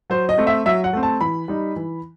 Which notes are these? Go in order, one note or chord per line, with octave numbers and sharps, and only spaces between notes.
F#3 C5
D#5
A3 C4
E5
F#3 E5
F#5
A3 C4
A5
E3 B5
G3 D#4
E3